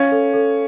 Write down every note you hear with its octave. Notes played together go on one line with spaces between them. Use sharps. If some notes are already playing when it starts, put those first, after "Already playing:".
Already playing: C#4 F5
A4
A4